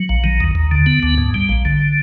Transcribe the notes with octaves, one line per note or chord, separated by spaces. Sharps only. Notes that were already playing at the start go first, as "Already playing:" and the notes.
Already playing: F#3
A#1
D#3
D#2
D#2
D3
B3
D2
G#2
G3
A#1
D3